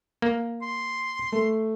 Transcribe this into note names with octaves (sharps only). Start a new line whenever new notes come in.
A#3
C6
A3